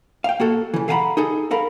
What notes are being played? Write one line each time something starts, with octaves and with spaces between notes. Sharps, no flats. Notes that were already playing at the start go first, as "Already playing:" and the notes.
F5 G5
A#3 F#4 A4
C#3 E3
A4 F5 F#5 G#5 A#5 B5
D#4 G#4 A4
A4 A#4 F5 B5